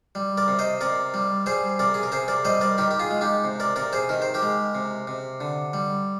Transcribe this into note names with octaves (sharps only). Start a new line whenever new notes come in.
G3
A#4 D5
C3
C5 D#5
C3 A#4 D5
G3
G3 G#4 C5
C3 A#4 D5
G#4
A#4
C3 G#4 C5
A#4 D5
G3 C5 D#5
A#4 D5
D#3 G4 A#4
G4
F4 G#4
G#3
D#4 G4
C3
A#4 D5
C3 A#4 D5
G#4 C5
D#3 A#4
C5
G4 A#4
G#3
C3
C3
D3
G3